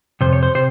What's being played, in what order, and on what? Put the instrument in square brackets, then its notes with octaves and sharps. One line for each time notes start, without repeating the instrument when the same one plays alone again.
[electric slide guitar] F2 C3 C5
C#5
C5
C3 C5